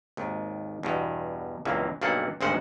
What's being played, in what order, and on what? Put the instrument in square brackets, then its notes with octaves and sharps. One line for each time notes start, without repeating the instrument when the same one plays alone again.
[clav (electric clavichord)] G#1 D#2
E2 G2 B2
C#2 G2 B2 E3 F#3 A#3
B1 G2 A#3 G#4 A4 F#5
G#1 D2 G2 G#3 C5 F#5